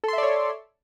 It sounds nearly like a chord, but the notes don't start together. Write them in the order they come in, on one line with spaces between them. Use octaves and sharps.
A4 C6 E5 D5 C#5